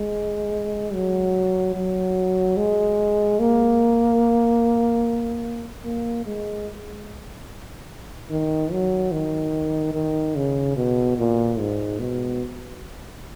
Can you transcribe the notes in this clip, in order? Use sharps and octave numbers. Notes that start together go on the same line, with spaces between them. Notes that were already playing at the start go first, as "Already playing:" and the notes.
Already playing: G#3
F#3
F#3
G#3
A#3
A#3
G#3
D#3
F#3
D#3
D#3
C#3
B2
A#2
G#2
B2